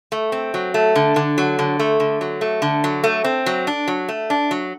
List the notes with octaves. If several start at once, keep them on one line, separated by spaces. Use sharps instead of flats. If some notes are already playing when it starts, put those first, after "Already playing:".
A3
C4
F#3
A3
D3
D3
F#3
D3
A3
D3
F#3
A3
D3
F#3
A3
C4
F#3
D4
F#3
A3
D4
F#3